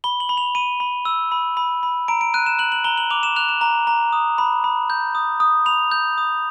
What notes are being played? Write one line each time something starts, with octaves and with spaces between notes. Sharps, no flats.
B5 G7
F#7
B5
F7
B5 D#7
B5
E6
B5
B5
B5
A#5 D7
D7
F#6 D#7
E7
F#6 F#7
F#7
A#5 G7
F#7
D6 F7
E7
F#6 F7
E7
A#5
A#5
D#6
B5
B5
G6
D#6
D#6
B5 F7
G6
D#6